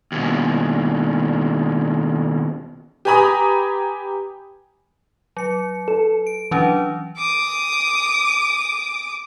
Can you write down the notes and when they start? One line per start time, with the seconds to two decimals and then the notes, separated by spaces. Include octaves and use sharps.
0.12 D#2 B2
3.05 G4 B4 G#5 A#5 B5 D#6
5.37 F#3 C#7
5.88 A4
6.27 D7
6.51 E3 F#3 C#4 D4
7.17 D6 D#6